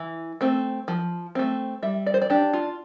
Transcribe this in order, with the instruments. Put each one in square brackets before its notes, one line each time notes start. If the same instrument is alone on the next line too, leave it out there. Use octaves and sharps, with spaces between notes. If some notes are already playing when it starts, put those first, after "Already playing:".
Already playing: [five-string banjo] E3
A3 C4
F3
A3 C4
G3 E5
D5
C5
D5
D4 G4
F4